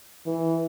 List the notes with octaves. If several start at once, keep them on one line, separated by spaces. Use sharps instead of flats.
E3